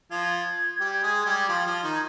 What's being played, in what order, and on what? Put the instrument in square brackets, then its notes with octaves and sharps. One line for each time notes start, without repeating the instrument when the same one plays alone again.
[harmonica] F3 F4 [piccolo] G#6
[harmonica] G3 G4
G#3 G#4
G3 G4
[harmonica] F3 F4 [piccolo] G#6
[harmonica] F3 F4
D#3 D#4